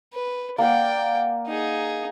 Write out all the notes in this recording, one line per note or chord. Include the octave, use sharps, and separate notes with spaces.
B4
A#3 D5 F#5 G5
D#4 G#4